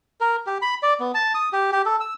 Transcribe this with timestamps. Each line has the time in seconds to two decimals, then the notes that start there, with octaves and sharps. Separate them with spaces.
0.21 A#4
0.46 G4
0.62 B5
0.83 D5
1.00 B3
1.14 A5
1.34 D#6
1.52 G4
1.72 G4
1.86 A4
2.01 E6